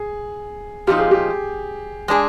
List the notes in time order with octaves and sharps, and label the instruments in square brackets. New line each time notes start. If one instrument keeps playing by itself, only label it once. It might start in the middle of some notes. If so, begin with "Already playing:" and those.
Already playing: [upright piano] G#4
[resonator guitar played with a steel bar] A#2 F3 C4 D#4 [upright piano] G4
[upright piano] G#4
G4
[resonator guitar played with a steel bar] G#3 D4 G#4